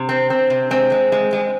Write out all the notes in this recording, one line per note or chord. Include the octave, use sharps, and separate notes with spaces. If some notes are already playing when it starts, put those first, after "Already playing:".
Already playing: C3
C4
C4
C3
G#3 C4
G#3
G#3
G#3